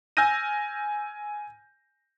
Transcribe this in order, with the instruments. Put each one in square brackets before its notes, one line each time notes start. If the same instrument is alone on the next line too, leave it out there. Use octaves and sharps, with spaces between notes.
[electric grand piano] G#5 E6 F6 G6 A#6 D#7